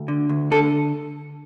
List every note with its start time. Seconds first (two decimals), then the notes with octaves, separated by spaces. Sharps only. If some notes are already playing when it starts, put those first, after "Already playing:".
Already playing: D2
0.08 D3
0.29 D2
0.51 D3 A4